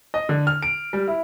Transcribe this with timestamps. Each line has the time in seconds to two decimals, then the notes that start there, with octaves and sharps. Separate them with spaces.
0.14 D#5
0.29 D3
0.47 F6
0.63 D7
0.93 G3
1.08 E4